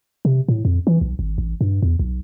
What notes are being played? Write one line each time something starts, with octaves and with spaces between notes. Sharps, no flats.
C3
A2
F2
E3
B1
G#1
A1
G2
E2
B1